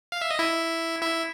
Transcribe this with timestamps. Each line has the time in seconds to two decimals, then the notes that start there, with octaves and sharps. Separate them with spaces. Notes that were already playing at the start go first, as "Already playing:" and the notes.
0.12 F5
0.22 E5
0.31 D#5
0.39 E4 E5
1.02 E4 E5